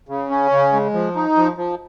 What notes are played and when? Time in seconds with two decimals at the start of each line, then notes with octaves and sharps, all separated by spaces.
0.09 C#3
0.30 C#4
0.51 C#3
0.73 G#3
0.94 F3
1.15 D#4
1.37 F3
1.57 F3